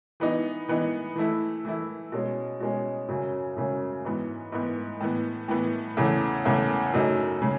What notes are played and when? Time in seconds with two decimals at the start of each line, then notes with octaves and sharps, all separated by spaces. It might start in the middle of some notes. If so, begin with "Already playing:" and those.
0.20 E3 B3 D#4
0.69 E3 B3 D#4
1.16 E3 A3 E4
1.65 E3 A3 E4
2.12 B2 G#3 C#4
2.60 B2 G#3 C#4
3.08 F#2 C#3 F#3 C#4
3.56 F#2 C#3 F#3 C#4
4.05 G#2 E3 B3
4.52 G#2 E3 B3
5.00 A2 E3 B3
5.48 A2 E3 B3
5.97 E2 C#3 E3 A3
6.45 E2 C#3 E3 A3
6.93 F#2 C#3 F#3 A3 D#4
7.42 C#3 F#3